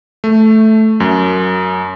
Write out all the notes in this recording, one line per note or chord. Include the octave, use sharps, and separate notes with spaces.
A3
F#2